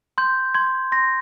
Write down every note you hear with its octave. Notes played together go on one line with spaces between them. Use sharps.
C6 G6
C6 G#6
C6 A#6